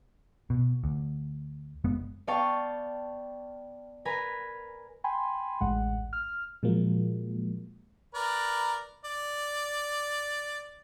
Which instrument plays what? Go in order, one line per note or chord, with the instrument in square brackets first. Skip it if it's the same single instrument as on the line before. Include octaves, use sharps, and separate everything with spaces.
[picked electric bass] B2
D2
F#1 G#3 B3
[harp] B3 D5 F5 G5 A5 C#6
A#4 B4 G#5 A#5 B5
[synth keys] G5 G#5 B5 C6
A1 D2 G#2 G#3 F#5
F6
[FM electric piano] A#2 F3 F#3 G#3 A#3
[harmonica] A#4 B4 D5
D5